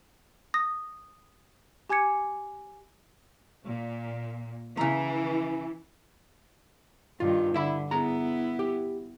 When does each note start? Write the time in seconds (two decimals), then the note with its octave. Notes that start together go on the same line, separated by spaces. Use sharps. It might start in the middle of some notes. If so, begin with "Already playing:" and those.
0.54 D#6 A#6
1.90 G4 G#5 D6 G#6 C#7
3.67 A#2
4.77 C#3 E3 A#5
7.20 G2 D#3 F4
7.54 D3 E4 E5 B5
7.91 B3 E4 G#4 A#5
8.59 G4